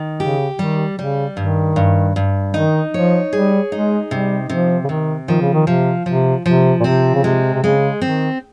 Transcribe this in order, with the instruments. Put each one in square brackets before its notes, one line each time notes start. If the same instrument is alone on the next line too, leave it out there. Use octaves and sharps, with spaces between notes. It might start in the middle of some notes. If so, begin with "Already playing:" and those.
Already playing: [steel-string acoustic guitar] D#3
[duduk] C#3 [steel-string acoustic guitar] G4
[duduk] D#3 [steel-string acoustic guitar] G3
[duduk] C#3 [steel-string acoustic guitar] G3
[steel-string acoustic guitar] G2 [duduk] D#3
[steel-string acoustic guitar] G2
G2
[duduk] D#3 [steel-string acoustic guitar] D#4
[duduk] F3 [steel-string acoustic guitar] C#5
[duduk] G3 [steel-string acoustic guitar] G#4
[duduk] G#3 [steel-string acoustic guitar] D#4
[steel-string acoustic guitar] C3 [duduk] G3
[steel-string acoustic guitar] C3 [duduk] F3
[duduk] C#3
[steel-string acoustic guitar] C3 [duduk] D#3
[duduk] D#3 [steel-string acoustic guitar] F3
[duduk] C#3
D#3
[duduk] C3 [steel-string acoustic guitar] F3
[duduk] C3 [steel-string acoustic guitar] F3
[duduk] C3 [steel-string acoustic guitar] F3
[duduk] A#2
[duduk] C3 [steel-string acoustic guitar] C4
[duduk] C#3
[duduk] C3 [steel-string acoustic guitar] G#3
[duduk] C3
[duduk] C#3 [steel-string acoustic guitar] G#3
[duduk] D#3 [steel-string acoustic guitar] C4